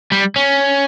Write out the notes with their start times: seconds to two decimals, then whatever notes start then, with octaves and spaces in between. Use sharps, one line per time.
0.12 G3
0.36 C#4